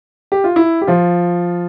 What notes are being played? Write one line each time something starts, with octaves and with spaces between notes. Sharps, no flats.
G4
F4
E4
G4
F3 F4